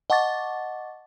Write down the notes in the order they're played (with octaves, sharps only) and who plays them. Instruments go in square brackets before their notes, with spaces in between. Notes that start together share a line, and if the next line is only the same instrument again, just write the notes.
[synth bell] D#5 F#5 A5 C#6 D6 A6